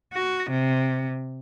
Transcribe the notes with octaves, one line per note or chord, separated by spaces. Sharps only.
F#4
C3